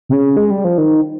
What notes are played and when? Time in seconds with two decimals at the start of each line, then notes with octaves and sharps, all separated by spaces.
0.09 C3
0.13 C#3
0.37 G#3
0.51 G3
0.64 F3
0.78 D#3